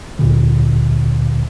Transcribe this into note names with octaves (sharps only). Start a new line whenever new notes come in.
D2 A#2 D3